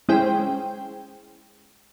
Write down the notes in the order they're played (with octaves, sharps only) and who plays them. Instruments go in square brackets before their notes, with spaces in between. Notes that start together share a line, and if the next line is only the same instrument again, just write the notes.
[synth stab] G#3 C#4 E4 G#4 C5 G5